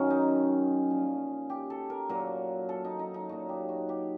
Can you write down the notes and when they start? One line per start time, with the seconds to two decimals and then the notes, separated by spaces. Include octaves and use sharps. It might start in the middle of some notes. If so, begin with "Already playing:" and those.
Already playing: F#2 D#3 F#3 C#4
0.10 D#4
0.90 A#2 F3
1.50 G4
1.70 A4
1.90 A#4
2.09 A#2 F#3 A#4
2.69 A4
2.85 D#4
2.99 D#4
3.14 D#4
3.29 A#2 F#3 F#4
3.49 G4
3.69 F#4
3.89 G4